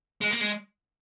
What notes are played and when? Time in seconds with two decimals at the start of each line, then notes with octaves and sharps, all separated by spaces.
0.21 G#3
0.31 A#3
0.41 G#3